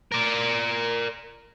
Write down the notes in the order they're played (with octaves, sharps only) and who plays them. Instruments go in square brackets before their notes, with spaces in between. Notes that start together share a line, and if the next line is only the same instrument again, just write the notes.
[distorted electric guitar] A#4 D5